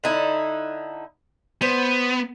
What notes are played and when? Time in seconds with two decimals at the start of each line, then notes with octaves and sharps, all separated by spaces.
0.04 D3 D#4 E4
1.62 B3 C5